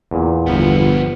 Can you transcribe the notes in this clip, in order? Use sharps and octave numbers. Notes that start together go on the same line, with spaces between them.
E2 A#2
G1 F3 B3